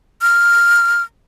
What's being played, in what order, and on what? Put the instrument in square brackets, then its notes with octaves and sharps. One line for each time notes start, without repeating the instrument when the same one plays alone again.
[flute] F6